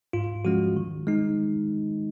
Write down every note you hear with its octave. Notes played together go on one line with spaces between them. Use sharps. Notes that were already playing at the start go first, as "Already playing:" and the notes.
G#2 F4
F3 G#3 C#4 F#4
D#3
G#3 D#4